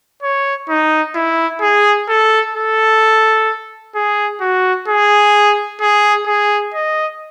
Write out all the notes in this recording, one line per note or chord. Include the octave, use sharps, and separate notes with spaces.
C#5
D#4
E4
G#4
A4
A4
G#4
F#4
G#4
G#4
G#4
D#5